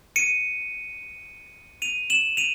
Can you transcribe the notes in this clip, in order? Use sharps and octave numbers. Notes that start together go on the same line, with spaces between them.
C#7 D#7
D#7 F7
E7 F#7
D#7 F7